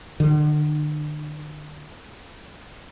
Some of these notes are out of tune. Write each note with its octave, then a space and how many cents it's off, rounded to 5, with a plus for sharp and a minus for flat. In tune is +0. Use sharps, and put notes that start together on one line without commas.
D3 +40